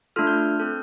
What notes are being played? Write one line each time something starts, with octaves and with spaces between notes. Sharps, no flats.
A3 D4 F4 A4 F6
G6
F6
C4 A4 G6